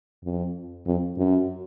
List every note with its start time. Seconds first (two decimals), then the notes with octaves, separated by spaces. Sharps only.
0.24 F2
0.86 F2
1.18 F#2